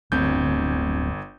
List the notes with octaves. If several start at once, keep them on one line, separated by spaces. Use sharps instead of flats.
D1 G1 C4 G6